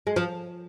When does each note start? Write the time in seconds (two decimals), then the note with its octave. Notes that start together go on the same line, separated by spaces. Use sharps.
0.07 G#3
0.16 F3